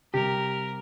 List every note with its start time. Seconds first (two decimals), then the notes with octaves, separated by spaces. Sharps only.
0.14 C3 G3 G4 A#4